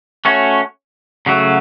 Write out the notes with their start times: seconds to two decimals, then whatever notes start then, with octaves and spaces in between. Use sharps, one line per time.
0.25 A3 C#4 F#4 C#5
1.26 C#3 F#3 A3 F#4